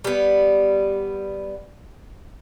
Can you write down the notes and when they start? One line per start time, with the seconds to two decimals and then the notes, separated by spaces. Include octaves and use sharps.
0.04 G3 B3